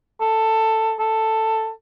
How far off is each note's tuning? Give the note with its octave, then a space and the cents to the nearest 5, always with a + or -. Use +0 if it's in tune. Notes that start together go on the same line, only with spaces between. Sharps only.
A4 +10
A4 +10